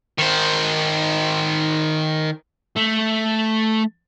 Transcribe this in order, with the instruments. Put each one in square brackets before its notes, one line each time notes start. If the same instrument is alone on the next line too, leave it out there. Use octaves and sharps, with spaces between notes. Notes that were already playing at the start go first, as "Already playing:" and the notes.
[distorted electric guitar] D#3 C5
A3